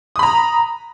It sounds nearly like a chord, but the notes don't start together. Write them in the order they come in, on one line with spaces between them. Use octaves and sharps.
D#6 B5 A#5